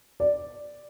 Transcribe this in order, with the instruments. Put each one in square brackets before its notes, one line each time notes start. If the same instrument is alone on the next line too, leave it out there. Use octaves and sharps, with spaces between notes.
[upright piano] D5